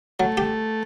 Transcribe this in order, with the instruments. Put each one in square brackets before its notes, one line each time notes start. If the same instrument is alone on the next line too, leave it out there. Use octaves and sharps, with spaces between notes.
[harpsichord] F#3 [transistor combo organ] A3
[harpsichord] G4